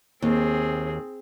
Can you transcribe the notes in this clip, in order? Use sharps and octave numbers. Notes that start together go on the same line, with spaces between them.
D#2 C4 G#4